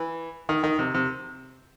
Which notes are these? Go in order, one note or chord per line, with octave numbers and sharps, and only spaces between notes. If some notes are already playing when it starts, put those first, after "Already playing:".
Already playing: E3
D#3
D#3
C3
C3